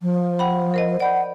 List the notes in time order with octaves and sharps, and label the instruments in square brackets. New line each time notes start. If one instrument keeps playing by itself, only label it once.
[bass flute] F3
[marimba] F#5 G5 B5
A#4 C5 D#5
[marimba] D5 B5 G6 [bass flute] F#5